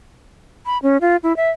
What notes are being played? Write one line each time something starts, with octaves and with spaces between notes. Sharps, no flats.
B5
C#4
F4
E4
E5